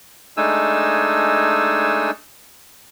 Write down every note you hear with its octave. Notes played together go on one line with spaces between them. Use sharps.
G#3 A3 D4 D#4 G#5 E6